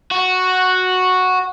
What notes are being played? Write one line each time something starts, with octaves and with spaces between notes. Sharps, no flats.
F#4